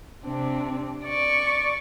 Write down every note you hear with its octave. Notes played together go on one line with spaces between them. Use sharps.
C3 C4 D4
D5 C#6